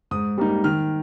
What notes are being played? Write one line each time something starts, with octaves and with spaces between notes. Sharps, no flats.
G#2 D#6
G3 A#3 D#4
D#3 F6